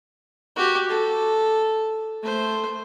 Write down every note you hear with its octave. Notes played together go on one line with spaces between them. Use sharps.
F#4 G4
A4
A3 C5